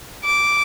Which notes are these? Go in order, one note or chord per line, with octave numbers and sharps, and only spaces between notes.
D6